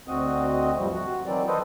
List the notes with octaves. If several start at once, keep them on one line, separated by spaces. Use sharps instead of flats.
D2 C4 F#4 D#5
G2 C3 F3 G3
F#4
D#3 E3 F#3 C4 D5
A4 B4 C5 D#5